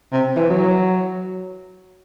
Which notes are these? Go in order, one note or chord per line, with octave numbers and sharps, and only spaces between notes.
C3
E3
F#3